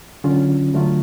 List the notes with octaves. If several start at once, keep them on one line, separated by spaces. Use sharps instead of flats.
D3 F#3 C#4 F4
D3 F#3 A3 F4